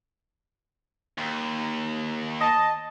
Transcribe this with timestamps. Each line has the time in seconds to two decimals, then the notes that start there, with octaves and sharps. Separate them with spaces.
1.18 D#2
2.41 D#5 A5